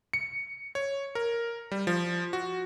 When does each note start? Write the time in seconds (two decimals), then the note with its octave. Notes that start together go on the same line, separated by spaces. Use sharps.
0.13 C#7
0.75 C#5
1.15 A#4
1.72 G3
1.87 F3
2.33 F#4